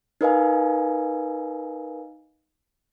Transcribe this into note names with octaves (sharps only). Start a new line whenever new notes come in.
D#4 A#4 B4 D#5 F5 G#5